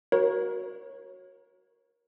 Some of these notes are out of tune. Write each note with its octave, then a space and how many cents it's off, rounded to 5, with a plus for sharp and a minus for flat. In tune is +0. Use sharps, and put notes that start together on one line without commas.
F#4 +0 A#4 +25 C#5 -25